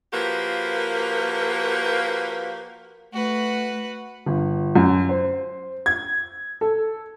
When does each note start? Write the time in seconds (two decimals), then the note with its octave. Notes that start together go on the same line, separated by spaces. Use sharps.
0.13 F3 A#3 F#4 G4 A#4 B4
3.13 A3 F#4 B4
4.26 G1
4.76 F#2
5.09 C5
5.86 G#6
6.61 A4